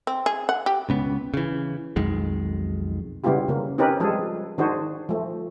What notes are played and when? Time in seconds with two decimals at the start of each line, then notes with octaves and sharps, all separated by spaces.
0.07 C4
0.26 G#4
0.49 F#5
0.66 G4
0.89 C#2 C#3 B3
1.34 C#3 E3
1.96 B1 F2 D#3 G#3
3.24 C#3 G3 B3 E4 F4 G4
3.48 C#3 A#3
3.78 C4 C#4 D#4 G4 A#4 B4
4.00 F3 G3 G#3 G#4 A4
4.58 D#3 D4 F#4 G#4 C5
5.09 F3 A3